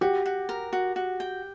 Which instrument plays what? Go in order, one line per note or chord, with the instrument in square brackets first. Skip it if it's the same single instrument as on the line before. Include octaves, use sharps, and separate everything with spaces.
[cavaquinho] F#4 [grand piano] G4
[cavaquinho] F#4
A#4
F#4
F#4
G5